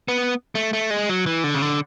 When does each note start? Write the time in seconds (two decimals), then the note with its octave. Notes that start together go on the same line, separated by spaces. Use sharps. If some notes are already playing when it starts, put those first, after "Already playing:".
0.08 B3
0.55 A3
0.73 A3
0.90 G#3
1.09 F#3
1.26 E3
1.44 D3
1.55 C#3
1.62 D3